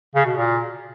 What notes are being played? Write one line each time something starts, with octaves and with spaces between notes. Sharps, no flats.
C#3
B2
A#2